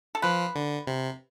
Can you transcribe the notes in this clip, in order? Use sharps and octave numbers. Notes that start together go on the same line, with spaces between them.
A4
F3 B4
D3
C3